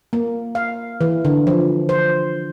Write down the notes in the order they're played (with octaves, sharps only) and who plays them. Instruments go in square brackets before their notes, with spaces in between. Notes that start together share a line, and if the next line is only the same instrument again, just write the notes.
[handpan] A#3
F5
E3
D3
F3
C5